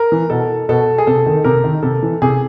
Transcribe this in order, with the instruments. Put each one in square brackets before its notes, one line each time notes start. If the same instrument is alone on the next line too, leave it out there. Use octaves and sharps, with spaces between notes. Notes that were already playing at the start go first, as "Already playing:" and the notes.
Already playing: [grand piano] A#4
E3
B2 A4
B2 A4
G#4
C3 A4
D#3
C3 A#4
D#3
C3 A4
E3
C3 G#4